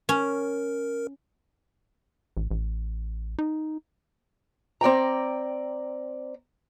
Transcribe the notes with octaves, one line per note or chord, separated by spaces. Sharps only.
C#4 A#4
A1
A1
D#4
C4 D5 G5 A#5